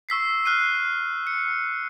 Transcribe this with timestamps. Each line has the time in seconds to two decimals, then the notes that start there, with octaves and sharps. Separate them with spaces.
0.09 C#6 E6 B6 C7
0.45 F6 F#6 C7 D#7
1.27 C#7